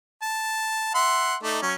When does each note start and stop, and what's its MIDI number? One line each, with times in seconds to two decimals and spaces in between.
0.22 0.92 81
0.94 1.35 76
0.94 1.35 78
0.94 1.35 84
1.43 1.60 57
1.43 1.60 63
1.43 1.60 74
1.62 1.75 54
1.62 1.75 61